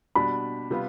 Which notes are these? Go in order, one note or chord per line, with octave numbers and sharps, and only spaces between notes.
B2 G3 D4 B5
C3 G3 B3 F4